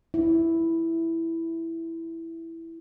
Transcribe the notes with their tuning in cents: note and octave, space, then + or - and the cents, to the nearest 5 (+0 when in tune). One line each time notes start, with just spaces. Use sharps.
E4 +0